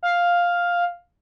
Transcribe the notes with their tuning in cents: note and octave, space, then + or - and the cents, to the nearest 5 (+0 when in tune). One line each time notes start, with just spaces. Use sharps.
F5 +5